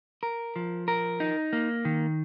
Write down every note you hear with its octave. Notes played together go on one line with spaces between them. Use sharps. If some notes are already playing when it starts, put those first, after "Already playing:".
A#4
F3
A#4
D#4
A#3
D#3